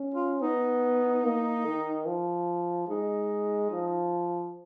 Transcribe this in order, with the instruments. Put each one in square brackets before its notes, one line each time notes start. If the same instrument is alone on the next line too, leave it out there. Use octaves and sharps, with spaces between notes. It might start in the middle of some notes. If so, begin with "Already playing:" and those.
Already playing: [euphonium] C#4
[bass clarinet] F4
[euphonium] B3 [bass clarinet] D#4
[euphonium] A#3
D#3
F3
[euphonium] G#3 [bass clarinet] D#4
[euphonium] F3